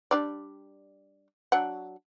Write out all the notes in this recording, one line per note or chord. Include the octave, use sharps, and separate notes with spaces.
G3 D4 D5
F#3 D4 F#5